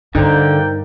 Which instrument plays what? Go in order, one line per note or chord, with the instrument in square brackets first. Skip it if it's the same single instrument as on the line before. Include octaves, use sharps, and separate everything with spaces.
[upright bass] G2 [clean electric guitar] D3 [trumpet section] A#3 G5 [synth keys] D#4 A#4 C5